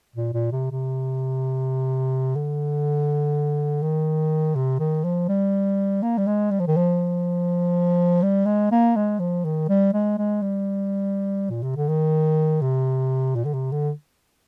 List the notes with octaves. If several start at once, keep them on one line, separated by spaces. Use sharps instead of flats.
A#2
A#2
C3
C3
D3
D#3
C3
D#3
F3
G3
A#3
G3
G#3
G3
F3
D#3
F3
G3
G#3
A#3
G#3
F3
D#3
G3
G#3
G#3
G3
A#2
C3
D3
D#3
C3
A#2
D3
C3
D3